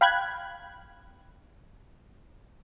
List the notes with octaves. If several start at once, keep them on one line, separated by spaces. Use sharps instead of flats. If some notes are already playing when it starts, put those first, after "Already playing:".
F5 G5 B5 F#6 G#6